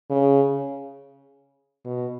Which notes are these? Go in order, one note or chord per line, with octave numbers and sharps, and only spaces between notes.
C#3
B2